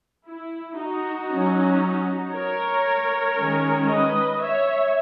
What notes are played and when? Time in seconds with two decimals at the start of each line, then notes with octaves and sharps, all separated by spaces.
0.26 E4
0.78 D#4 F#4
1.29 F#3 C#4
2.33 A#4 C#5
3.37 D#3 G#3 C#4
3.88 B4 D#5
4.40 C#5 E5